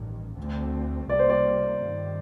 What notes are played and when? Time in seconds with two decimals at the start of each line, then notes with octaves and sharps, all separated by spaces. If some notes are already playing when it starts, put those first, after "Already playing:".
Already playing: A1 G2 D#3
0.37 D2 D3 A3 C4
1.09 C2 C3 G3 A#3 D5
1.19 C5
1.30 D5
1.82 G2 D#3 G3